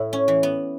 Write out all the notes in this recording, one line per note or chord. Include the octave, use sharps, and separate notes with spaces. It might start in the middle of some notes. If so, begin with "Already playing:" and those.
Already playing: A2 E4
C#4
E3
B3